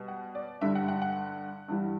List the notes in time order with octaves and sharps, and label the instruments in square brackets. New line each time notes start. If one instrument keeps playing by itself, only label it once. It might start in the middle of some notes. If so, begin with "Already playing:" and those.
Already playing: [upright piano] B2 G3
F#5
D5
G2 D3 G3 E5
F#5
F#5
F#5
G2 E3 G3